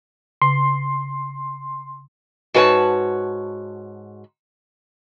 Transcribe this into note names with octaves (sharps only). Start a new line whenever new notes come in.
C#3 C6
G#2 F#4 B4 C#5 A5